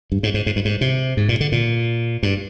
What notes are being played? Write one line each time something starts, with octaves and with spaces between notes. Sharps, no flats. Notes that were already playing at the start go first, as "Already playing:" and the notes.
G2
G#2
G#2
G#2
G2
G#2
C3
G#2
A#2
D3
A#2
G2